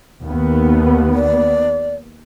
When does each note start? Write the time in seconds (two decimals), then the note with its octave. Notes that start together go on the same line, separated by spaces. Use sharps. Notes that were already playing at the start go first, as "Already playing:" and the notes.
0.25 D#2 B3
1.14 D5